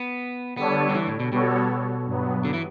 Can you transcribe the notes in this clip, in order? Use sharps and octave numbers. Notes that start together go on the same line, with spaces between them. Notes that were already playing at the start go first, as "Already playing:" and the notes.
Already playing: B3
D3 G3 B3 D4 A4 C#5
D3
E3
A2
B2
B2 G3 B3 F#4 A4 C#5
G2 F#3 B3
D3
E3